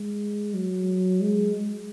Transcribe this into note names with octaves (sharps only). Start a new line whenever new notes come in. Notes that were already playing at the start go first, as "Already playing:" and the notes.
Already playing: G#3
F#3
G#3